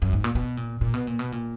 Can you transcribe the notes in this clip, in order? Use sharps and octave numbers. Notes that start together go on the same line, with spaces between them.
F#2
G#2
A#2
B2
A#2
A#2
B2
A#2
B2
A#2